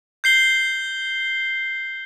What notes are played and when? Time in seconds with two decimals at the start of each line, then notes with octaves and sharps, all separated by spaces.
0.24 G6 C7 G7